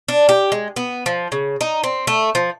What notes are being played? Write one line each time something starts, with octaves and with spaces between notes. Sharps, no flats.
D4
G4
G#3
B3
F3
C#3
D#4
C4
A3
F3